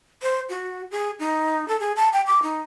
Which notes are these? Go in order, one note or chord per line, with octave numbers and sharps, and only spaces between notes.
C5
F#4
G#4
D#4
A4
G#4
A5
G5
D6
D#4